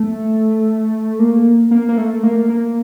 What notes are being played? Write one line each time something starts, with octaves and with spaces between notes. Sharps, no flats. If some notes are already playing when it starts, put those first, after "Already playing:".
Already playing: A3
A#3
A#3
A#3
A3
A#3
A#3